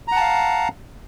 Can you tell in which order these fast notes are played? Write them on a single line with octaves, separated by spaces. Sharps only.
A#5 F#5 A5 F5